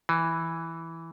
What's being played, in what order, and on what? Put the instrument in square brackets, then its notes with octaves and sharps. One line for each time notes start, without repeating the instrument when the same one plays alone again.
[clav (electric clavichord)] E3